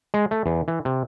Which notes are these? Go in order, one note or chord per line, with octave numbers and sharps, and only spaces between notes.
G#3
A3
E2
E3
C3